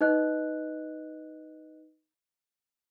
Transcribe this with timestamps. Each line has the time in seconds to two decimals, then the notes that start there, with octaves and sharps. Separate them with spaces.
0.01 D#4 B4 D#5 F#6